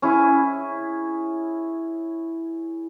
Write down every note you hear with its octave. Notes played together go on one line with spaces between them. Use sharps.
C#4 E4 G#4